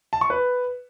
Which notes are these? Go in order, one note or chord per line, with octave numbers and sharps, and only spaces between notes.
A5
C#6
B4